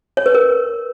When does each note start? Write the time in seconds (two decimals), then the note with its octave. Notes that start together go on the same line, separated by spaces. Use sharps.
0.17 C#5
0.26 B4
0.34 A#4